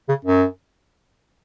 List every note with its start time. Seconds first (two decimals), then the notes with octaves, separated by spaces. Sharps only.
0.08 C#3
0.25 F#2